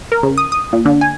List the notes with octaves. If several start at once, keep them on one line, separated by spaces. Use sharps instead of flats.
A#4
C#3
D#6
D#6
A#2
D3
G#5